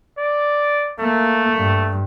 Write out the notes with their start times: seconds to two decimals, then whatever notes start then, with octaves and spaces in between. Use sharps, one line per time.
0.18 D5
0.99 A3 A#3
1.58 G2